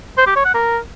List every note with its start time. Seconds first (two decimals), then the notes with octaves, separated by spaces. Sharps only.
0.18 C5
0.27 G4
0.36 C#5
0.45 F#5
0.54 A#4